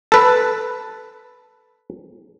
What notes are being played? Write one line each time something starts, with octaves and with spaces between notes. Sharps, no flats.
A4 B4